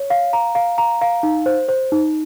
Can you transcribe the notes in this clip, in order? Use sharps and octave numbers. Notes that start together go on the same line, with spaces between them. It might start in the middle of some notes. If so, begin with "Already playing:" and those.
Already playing: C#5
F5
A#5
F5
A#5
F5
D#4
C5
C5
D#4